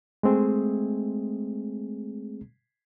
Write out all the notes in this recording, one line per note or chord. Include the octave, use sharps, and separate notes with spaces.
G#3 A3 C4 G#4